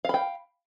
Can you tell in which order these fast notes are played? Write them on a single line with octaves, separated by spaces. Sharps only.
F5 B5 G5